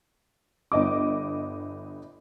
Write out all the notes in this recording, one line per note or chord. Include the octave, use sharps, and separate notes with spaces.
G1 D#5 D6